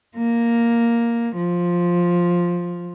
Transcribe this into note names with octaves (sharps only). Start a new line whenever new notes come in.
A#3
F3